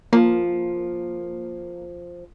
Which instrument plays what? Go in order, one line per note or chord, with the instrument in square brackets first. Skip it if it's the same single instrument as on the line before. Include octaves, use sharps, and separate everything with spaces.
[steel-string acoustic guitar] F3 [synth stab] A#3